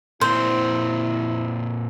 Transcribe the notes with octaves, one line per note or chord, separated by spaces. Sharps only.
A#2 C4 E4 C5